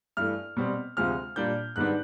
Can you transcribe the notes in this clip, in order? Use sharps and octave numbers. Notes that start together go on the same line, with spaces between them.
G2 E3 A3 F6
B2 G3 C4
D2 C3 F3 G#3 F6
A#2 G3 A#3 D4 G6
G#2 D#3 G3 B3 D4 F#6